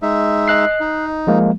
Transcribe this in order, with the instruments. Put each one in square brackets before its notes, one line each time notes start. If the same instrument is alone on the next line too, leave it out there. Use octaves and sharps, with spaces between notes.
[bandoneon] G#3 D#4 E5
[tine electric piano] D#5 F#6 C7
[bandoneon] D#4
[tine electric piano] F3 G#3 A#3